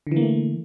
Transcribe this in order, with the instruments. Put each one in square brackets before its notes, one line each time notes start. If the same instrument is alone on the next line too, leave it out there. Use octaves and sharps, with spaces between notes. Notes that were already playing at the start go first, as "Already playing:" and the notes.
[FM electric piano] D3
E3
A#3
A3